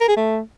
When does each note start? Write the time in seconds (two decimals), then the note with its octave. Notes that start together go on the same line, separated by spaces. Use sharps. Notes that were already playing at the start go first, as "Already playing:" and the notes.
0.01 A#4
0.09 G#4
0.17 A3